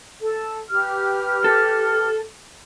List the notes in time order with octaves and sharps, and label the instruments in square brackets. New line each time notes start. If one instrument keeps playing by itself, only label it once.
[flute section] A4
G4 B4 F6
[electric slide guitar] A4